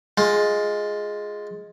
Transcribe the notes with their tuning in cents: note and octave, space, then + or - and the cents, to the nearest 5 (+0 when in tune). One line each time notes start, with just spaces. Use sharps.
G#3 +5 F4 +15